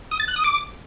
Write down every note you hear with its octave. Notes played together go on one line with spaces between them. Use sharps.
D#6
A6
F#6
D#6
D6